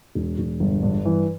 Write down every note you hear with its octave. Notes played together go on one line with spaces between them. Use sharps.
E1
E1
G1
G2
E3